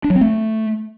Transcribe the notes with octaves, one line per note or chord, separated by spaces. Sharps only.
D4
F#3
C4
A3